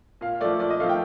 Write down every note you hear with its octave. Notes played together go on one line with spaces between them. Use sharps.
A#2 F5
F3 A3 D5
A#2 D5
D#5
F3 A3 F5
G5